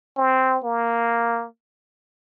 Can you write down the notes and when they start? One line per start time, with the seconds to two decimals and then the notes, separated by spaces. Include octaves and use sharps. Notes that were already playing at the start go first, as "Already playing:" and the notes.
0.17 C4
0.64 A#3